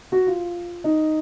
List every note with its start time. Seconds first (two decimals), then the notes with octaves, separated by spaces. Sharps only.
0.12 F#4
0.27 F4
0.84 D#4